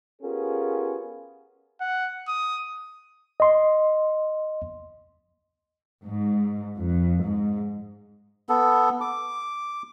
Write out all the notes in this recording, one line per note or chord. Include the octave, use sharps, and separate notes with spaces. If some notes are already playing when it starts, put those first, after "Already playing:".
B3 C#4 F4 G4 G#4 A#4
F#5
D#6
D#5 C6
G#2
F2
G#2
B3 A4
D6